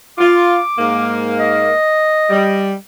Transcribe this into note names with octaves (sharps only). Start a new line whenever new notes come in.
F4 D6
G#2 A#3
D#5
G3